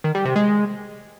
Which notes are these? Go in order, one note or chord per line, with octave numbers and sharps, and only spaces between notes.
D#3
G3
C3
G#3